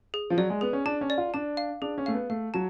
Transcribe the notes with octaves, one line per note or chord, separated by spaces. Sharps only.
G#4
F3
F#3 D5
G#3
B3 G#4
C#4
D4 A5
C#4
D5
F4
D4 A5
F5
D4 G#4
C#4
A3 F5
B3
A3 F5
F#3 A5